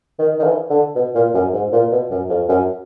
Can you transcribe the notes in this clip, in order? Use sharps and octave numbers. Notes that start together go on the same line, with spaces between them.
D#3
D#3
E3
D3
B2
A#2
F#2
G#2
A#2
B2
F#2
F2
F#2